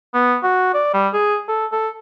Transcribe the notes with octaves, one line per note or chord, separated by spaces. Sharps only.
B3
F#4
D5
G3
G#4
A4
A4